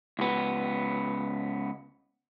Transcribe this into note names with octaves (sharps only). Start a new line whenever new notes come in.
C#2 B3